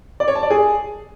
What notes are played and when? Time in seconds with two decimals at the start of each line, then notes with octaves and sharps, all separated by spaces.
0.20 D5
0.28 C#5
0.35 A5
0.43 D5
0.50 G#4